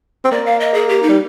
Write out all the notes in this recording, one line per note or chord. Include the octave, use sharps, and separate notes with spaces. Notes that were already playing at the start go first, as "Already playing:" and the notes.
C4
A#3 D5
F5
D#5
G#4
G4
D#4
G3